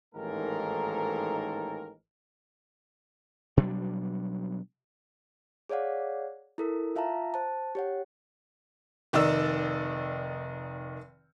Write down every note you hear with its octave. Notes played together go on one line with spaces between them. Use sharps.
A1 G#2 D#3 A#3 A4 A#4
B2 F#3 G3 D4
G#4 C#5 D5 F5 F#5
E4 A4 A#4
F4 E5 F5 A5 A#5
C5 A5
G4 C#5 F#5
F1 D#3 D#4 D5 E6